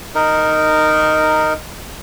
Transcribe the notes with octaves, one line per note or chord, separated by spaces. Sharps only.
D#4 A#4